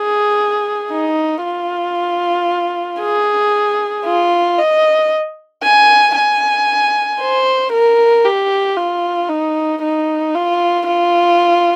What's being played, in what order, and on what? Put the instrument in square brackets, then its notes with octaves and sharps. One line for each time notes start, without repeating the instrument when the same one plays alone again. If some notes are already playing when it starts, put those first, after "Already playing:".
Already playing: [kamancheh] G#4
D#4
F4
G#4
F4
D#5
G#5
G#5
C5
A#4
G4
F4
D#4
D#4
F4
F4